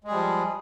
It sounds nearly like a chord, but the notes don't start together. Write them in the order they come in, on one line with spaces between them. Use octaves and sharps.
G#3 G#4 G3 F3